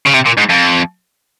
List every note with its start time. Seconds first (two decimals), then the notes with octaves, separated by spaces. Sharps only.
0.07 C#3
0.14 C3
0.26 A#2
0.38 G#2
0.50 F2